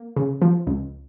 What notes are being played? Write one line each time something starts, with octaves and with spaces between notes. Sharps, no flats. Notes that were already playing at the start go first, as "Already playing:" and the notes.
Already playing: A#3
C#3
F3
C#2